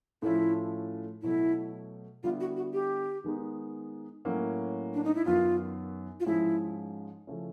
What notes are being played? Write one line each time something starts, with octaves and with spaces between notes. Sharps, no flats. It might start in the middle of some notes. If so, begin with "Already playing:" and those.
A2 F3 A3 C#4 E4 F4
B2 F#3 A3 E4
D3 G3 B3 E4 F4
F#4
F#4
G4
D#3 G#3 B3 D#4
A2 F#3 A#3 C#4
D4
D#4
E4
F#2 D#3 F#3 B3 F4
F4
G#2 F3 G#3 C#4 E4
C#3 F3 A3 C#4 E4